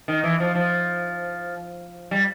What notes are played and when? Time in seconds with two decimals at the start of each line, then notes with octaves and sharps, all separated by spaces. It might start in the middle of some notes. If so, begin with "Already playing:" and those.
0.08 D#3
0.24 E3
0.40 F3
0.55 F3
2.11 G3